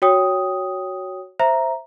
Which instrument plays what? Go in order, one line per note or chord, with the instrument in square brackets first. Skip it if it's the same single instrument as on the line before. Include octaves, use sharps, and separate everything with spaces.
[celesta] F#4 C#5 G5 D#6
C5 E5 A#5